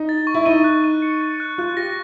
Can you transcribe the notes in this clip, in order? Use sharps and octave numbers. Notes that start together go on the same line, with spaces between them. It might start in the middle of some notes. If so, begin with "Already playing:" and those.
Already playing: D#4
A6
C#6
E4
D#4 D#7
F#6
D#7
C#7
A6
F#6
F4 F#6
G4 A#6